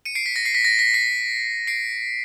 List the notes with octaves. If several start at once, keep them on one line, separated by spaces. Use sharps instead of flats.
C#7 D#7
C7 D7
B6
A#6
C7
B6
A#6
B6
C7
C7 D7